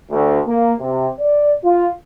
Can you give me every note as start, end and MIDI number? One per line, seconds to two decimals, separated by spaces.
0.11 0.40 38
0.46 0.72 58
0.79 1.08 48
1.20 1.52 74
1.64 1.89 65